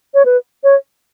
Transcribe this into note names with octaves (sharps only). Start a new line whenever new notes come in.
C#5
B4
C#5